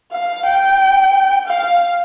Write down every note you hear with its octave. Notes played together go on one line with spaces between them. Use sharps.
F5
G5
F5